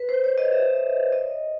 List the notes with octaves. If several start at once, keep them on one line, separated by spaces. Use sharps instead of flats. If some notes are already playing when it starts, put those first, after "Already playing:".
Already playing: B4
C5
C#5
D#5
E5
D#5